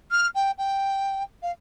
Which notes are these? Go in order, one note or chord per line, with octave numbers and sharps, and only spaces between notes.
F6
G5
G5
F5